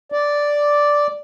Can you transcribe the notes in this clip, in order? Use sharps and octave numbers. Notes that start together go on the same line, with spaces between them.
D5